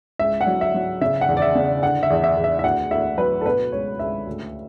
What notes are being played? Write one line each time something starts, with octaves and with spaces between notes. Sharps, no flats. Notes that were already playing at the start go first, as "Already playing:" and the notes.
C#2 E5
F#5
F#3
E5
F#3
C#3 E5
F#5
E2
D5
E5
C#3
D3 F#5
E5
E2
E5
E2
E5
E5
D2 F#5
D2 E5
F#3 B4
A4
B2 B4
C#2 C#5
C#2 E5
D2